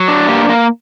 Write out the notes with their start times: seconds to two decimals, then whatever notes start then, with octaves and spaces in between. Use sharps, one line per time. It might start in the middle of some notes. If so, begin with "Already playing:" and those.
Already playing: F#3
0.08 D4
0.28 A#3 G4
0.49 A#3